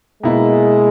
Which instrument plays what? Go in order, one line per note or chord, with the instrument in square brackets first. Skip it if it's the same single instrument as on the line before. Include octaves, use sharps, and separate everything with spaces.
[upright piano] B2 A#3 E4 [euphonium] G#3